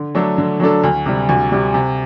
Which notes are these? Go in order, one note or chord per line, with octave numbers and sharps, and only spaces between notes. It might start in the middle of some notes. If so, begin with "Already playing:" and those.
Already playing: D3
F#3 A3 D4 A4
D3
F#3 A3 D4 A4
D2
C3 G3
D2
C3 G3
C3